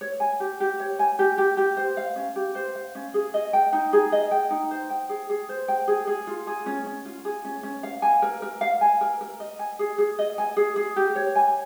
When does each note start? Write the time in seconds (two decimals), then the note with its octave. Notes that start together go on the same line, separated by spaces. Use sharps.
0.01 C#5
0.20 G#5
0.40 G4
0.60 G4
0.80 C#5
0.99 G#5
1.19 G4
1.38 G4
1.57 G4
1.77 C5
1.97 F5
2.16 C#4
2.36 G4
2.55 C5
2.75 F5
2.95 C#4
3.14 G#4
3.34 D#5
3.53 G5
3.73 D#4
3.93 G#4
4.12 D#5
4.31 G5
4.50 D#4
4.71 C5
4.90 G5
5.09 G#4
5.29 G#4
5.49 C5
5.68 G5
5.87 G#4
6.07 G#4
6.27 F4
6.47 G#4
6.66 C#4
6.86 C#4
7.05 F4
7.25 G#4
7.45 C#4
7.63 C#4
7.83 F5
8.02 G#5
8.22 A#4
8.42 A#4
8.61 F5
8.81 G#5
9.01 A#4
9.21 A#4
9.40 D#5
9.59 G#5
9.79 G#4
9.98 G#4
10.19 D#5
10.38 G#5
10.57 G#4
10.76 G#4
10.96 G4
11.15 C#5
11.36 G#5